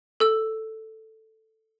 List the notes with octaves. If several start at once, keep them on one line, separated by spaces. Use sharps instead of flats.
A4 E6